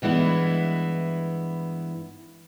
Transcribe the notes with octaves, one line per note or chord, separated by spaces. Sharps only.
G2 E3 G#3 B3 E4